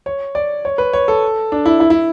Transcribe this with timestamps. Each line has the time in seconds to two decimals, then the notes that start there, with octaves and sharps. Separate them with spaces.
0.06 C#5
0.35 D5
0.65 C#5
0.78 B4
0.93 C#5
1.08 A4
1.52 D4
1.66 E4
1.80 E4
1.90 E4